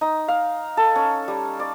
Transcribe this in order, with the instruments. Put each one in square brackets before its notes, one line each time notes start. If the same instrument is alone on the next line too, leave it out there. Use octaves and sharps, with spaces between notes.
[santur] D#4
F5
A4
C#4
G3
D5